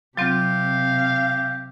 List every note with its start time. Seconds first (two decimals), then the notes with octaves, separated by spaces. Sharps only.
0.17 C3 F#3 C4 F4 G4 F5